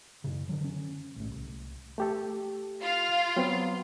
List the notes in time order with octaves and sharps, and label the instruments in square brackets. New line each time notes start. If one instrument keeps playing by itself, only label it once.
[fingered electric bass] F#2 C#3
D3 F#3
C#4
A#1 A2
C2
[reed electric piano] A3 G4 A4
[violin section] F4 F5
[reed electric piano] F#3 B3 C4